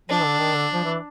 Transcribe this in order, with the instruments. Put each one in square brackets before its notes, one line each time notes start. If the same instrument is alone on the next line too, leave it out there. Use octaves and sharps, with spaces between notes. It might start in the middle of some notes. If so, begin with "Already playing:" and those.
[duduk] F3 [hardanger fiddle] D4
[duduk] D3
D#3
D3
F3
E3